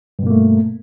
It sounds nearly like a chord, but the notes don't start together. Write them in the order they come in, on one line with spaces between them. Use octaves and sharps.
G2 B2 A#3 A3